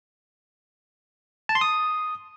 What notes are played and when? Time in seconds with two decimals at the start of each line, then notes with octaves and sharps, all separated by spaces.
1.49 A5
1.55 C6
1.61 D#6